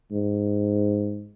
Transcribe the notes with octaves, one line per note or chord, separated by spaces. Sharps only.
G#2